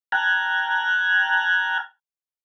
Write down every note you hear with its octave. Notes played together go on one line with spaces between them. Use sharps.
G5 A5 A#5 F6 F#6 G#6